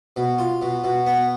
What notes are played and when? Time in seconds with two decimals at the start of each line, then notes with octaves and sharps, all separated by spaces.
0.16 B2
0.39 F4
0.62 B2
0.84 B2
1.06 B3